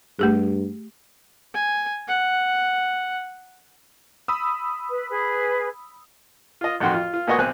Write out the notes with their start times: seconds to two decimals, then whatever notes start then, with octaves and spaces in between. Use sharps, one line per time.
0.19 G2 A3 G4 G#4
1.54 G#5
2.08 F#5
4.28 B5 D#6 E6
4.89 B4
5.09 G#4 B4
6.61 F4 D#5
6.80 A1 F2 D#3 F#4 G5 C6
6.94 F4
7.14 F4
7.27 A#2 B3 F#4 D#5 G#5 C#6
7.39 B1 C4 G#5 F#6